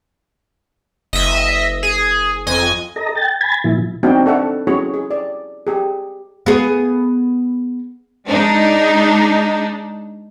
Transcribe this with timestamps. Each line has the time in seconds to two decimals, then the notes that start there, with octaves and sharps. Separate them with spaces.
1.13 F#1 D#5 E5
1.83 G#4
2.46 F2 D#5 G#5
2.96 A4 D#5 A#5
3.15 G5 A6
3.41 G#5 B5 G#6 A6
3.64 A#2 F3 E4
4.03 C4 D4 D#4 F#4 G5
4.26 D4 A4 E5 F#5
4.67 C#4 E4 F#4 G#4 C#5
4.94 G#4
5.11 D5
5.67 G4 G#4
6.46 B3 G#4
8.27 G#3 D4 D#4